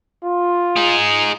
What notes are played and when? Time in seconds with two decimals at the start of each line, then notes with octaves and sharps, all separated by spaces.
0.25 F4
0.77 D#4 G#4